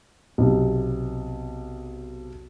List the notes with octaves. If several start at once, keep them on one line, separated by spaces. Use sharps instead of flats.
B1 C3